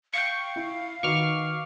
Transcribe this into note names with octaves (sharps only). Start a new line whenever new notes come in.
F5 G5 C#6
E4
D#3 F#4 B4 C#6 D6 F6